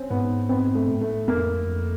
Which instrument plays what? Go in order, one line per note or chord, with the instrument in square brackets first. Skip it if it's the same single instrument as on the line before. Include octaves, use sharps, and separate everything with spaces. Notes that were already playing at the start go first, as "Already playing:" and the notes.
Already playing: [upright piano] C4 C#4
[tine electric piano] G#2 [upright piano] B3
[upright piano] B3 [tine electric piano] C4
[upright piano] A3
[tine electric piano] A2
[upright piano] A3
[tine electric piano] F2 [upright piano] A#3
[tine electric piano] F2